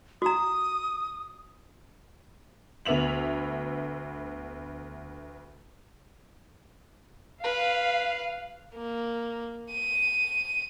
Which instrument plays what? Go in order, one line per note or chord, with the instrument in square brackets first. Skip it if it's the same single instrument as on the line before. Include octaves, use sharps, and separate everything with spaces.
[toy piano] F#4 A#5 [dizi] D#6
[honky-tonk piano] D2 B3 E5 F7 F#7
[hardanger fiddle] B4 [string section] F5
[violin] A#3
D#7